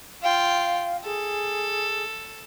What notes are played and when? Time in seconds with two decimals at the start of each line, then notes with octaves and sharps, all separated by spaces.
0.22 F4 F5 G5
1.04 G#4 A4